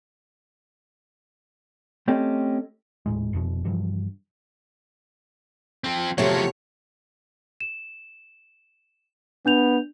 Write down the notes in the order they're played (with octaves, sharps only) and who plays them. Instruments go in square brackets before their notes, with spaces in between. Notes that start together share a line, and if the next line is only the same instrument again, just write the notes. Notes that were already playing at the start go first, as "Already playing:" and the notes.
[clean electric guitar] A3 C4 C#4 G4 A4 D#5
[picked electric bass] D#1 A2 G#3
F1 F2 B2 F3
G2 C3 E3 F3
[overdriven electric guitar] F3 C4
[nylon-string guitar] E2 C3 A3 [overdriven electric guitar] F3 F#3 [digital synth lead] C#5
[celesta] E7
[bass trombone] B3 [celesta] D4 G6 F7